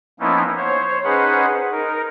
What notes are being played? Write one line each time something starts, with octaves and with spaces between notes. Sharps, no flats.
F3 A#3 B3 C#4 D#4 E4
C5 C#5
C#4 D#4 G#4 B4 C5 F#5
D#4 A#4